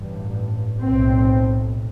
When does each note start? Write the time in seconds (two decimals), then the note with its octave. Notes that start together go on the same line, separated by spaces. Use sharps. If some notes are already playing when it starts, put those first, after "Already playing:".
Already playing: A1 G2
0.81 B1 A2 C4